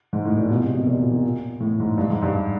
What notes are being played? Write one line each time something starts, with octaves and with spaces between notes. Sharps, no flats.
G#2
A2
A#2
B2
C3
B2
A#2
B2
A#2
A2
G#2
G2
G#2
G2